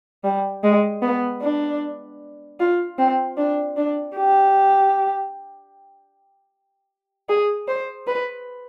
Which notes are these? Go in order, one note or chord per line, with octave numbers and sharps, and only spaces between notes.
G3
G#3
B3
D4
F4
C4
D4
D4
G4
G#4
C5
B4